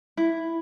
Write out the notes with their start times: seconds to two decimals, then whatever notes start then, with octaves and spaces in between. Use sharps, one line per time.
0.17 E4